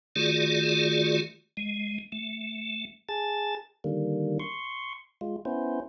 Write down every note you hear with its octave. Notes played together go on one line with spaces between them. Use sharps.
D#3 A3 F4 F#4 G#4 D5
G#3
A3
G#4 A5 A6
D3 D#3 G3 A#3
C6 C#6
G#3 F4
B3 C#4 E4 C5